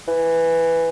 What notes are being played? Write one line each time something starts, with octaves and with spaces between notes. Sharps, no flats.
E3